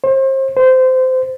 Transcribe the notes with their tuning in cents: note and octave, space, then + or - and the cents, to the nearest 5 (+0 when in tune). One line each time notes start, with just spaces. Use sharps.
C5 +35
C5 -20